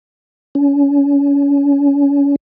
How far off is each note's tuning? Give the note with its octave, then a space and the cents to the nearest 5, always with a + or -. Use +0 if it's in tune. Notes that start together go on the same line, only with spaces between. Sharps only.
C#4 +30